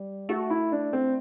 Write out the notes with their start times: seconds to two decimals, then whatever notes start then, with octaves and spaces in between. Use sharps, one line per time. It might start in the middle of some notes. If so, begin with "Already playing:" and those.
Already playing: G3
0.29 A3 F#4
0.50 E4
0.72 D4
0.93 C4